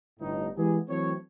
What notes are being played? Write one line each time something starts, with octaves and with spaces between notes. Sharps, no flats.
G1 A2 D#4
E3 G#3 B3 G4 G#4
E3 F#3 A3 C4 C#5